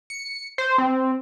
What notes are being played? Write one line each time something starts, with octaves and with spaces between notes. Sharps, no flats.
C#7
C5
C4